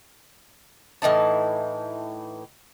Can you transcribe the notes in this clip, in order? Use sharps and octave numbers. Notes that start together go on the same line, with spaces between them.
A2 E3 D#4 A5